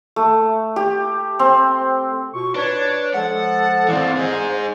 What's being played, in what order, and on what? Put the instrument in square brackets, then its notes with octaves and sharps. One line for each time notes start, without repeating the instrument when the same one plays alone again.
[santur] A3
G4
C4
[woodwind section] B2 F4 C#6
[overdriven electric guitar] D4 [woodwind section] B4 C#5
[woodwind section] F3 G#3 A4 [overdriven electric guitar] F#5
[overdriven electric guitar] E3 C4 [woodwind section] D5 F5
[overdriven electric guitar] D#4 G#4 [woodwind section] C5